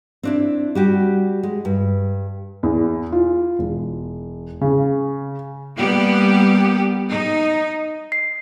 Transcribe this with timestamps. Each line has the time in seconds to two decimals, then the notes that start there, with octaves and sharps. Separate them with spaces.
0.23 C4 D4 E4
0.75 G3 F#4 G4
1.43 G#3
1.65 G2
2.63 E2
3.12 F4
3.59 E1
4.61 C#3
5.78 G3 A#3 B3 G4
7.08 D#4
8.12 C7